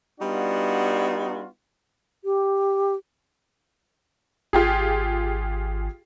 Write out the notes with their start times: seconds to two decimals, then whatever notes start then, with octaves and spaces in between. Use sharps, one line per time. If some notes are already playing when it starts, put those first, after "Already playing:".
0.21 G3 B3 D4 D#4 F4 F#4
2.25 G4
4.53 G#1 F4 G4 G#4